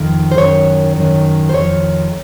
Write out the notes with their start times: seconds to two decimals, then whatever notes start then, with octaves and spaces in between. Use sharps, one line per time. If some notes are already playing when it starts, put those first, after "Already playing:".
Already playing: F2 D#3
0.31 C5
0.38 F#2 D#3 C#5
0.96 F#2 D#3
1.49 C5
1.54 F2 D#3 C#5